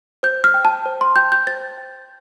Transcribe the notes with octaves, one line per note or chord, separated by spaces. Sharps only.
C5 G6
F6
G5
A5
C5
C6
G5 G6
G6
C5 A6
G5